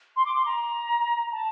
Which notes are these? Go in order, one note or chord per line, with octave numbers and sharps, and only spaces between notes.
C6
D6
C6
A#5
A5